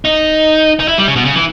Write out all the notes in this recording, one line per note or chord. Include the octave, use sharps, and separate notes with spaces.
D#4
D#4
E4
G3
C#3
B2
C#3
E3